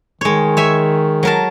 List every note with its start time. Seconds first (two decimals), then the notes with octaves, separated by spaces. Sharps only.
0.21 D#3 G#3 C#5
0.57 C#5 E5 G#5
1.23 F#3 A#4 A5